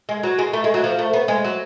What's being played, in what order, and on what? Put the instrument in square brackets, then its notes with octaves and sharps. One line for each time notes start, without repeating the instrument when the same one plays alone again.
[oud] G#3
F#3
G#3
A3
G#3
F#3
F3
A3
B3
G#3
F#3